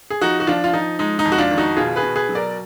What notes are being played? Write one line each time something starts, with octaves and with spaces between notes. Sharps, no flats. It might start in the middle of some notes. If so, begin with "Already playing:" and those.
G#4
F3 D#4 F#4
F#4
F3 D4 F4
F4
F3 D#4
G#3 D#4
D#4
F2
F#4
D4 F4
D#3
D#4 F#4
B2 F4 G#4
G#4 B4
B2
G#4 B4
F#3
A#4 D5